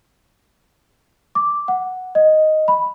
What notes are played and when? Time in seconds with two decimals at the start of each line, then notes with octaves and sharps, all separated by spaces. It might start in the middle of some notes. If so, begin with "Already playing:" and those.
1.35 D6
1.68 F#5
2.15 D#5
2.68 B5